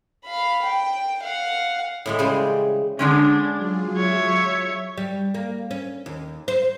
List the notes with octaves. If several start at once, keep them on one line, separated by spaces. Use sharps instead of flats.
F5 B5
G5
F5 F#5
A2 E3 G#3
C#3 G3 G#3 C5 D5 G#5
D3 G#3 C#4 D4
F#3 F4 G#4
C#5 E5
G3
A#3
C#4
D#2
C5